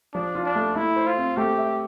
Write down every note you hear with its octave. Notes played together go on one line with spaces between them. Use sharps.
F3 D4
F4
D4
A3
A3 E4
C5
F4
C4
A3 G4
E5